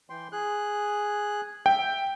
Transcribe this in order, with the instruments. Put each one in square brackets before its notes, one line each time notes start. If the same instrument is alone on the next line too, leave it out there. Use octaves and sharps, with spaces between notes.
[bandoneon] E3 G5 C6
G#4 F#6
[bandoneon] E5 [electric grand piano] G5